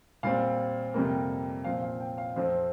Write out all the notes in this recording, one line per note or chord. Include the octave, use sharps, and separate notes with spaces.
A#2 G3 C4 F5
F2 C3 G3 A#3
A#2 F3 C4 F5
F5
G5
F5
F2 F3 C4 C5